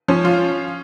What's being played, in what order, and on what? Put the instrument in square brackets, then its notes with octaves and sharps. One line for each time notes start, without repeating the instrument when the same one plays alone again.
[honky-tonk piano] F3 [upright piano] C#4
[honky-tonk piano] F4